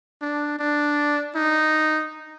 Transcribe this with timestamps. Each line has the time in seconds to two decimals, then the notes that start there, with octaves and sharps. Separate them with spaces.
0.22 D4
0.59 D4
1.35 D#4